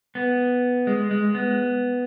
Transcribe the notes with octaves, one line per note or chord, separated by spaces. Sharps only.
B3
G#3
G#3
B3